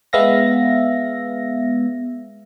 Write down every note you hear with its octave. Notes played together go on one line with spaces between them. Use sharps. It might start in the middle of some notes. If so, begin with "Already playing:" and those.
G#3 B3 E5 F5 A#6